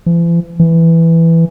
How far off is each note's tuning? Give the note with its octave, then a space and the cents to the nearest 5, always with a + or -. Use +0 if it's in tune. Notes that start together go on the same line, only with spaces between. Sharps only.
E3 +45
E3 +5